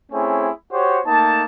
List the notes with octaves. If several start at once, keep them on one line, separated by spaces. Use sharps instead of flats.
A3 C4 C#4 E4 G#4
F#4 G4 C5 C#5
A3 A#3 D#4 A5